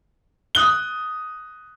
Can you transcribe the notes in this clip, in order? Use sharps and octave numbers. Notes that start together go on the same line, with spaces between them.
D#6 F#6 G7